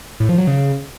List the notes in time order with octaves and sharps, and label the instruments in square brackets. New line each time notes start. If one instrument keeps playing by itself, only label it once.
[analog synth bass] A2
F3
F#3
C#3